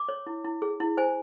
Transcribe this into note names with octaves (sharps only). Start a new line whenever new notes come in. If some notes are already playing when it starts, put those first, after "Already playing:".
Already playing: D6
C#5
E4
E4
G#4
E4
C5 G#5